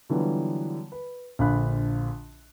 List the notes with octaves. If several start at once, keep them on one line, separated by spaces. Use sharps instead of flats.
D3 E3 F#3 G3 B3 F4
B4
A#1 D3 F5 B5 F#6